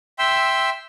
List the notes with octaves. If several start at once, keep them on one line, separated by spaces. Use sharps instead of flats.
E5 G5 C6 E6